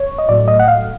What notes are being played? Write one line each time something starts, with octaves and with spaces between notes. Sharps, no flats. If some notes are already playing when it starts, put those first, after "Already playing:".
Already playing: C#5
D#5
A2 F#3 A3 D5
D#5
F#5
F5